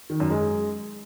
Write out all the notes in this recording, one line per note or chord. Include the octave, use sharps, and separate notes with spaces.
D#3
F#2
G#3